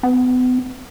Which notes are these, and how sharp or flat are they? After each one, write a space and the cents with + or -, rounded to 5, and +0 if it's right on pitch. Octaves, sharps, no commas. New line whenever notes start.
B3 +35